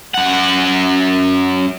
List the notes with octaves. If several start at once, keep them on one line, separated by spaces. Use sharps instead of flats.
F#2 F#5